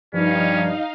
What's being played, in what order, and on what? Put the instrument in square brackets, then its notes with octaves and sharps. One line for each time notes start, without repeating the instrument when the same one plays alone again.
[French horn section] G2 G3 [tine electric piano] F3 [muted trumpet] C#4 [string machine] D#4 F5